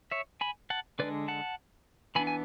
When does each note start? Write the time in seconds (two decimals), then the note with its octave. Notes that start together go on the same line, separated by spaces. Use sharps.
0.11 C#5 E5
0.41 G#5 B5
0.70 F#5 A5
0.99 D3 G#3 D4 B4 D5
1.28 F#5 A5
2.15 E3 B3 D4 G#5 B5
2.27 G#5